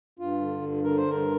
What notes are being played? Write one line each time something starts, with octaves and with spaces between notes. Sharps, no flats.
G2 F4
D3
G2
D3 A#4
C5
G2 A#4